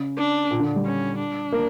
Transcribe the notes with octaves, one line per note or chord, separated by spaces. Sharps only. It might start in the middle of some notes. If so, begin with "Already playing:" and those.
Already playing: C#3
D4
A#2
D3
G3
C#4
D4
A#3